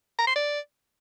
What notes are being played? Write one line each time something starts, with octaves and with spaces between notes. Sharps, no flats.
A#5
C6
D5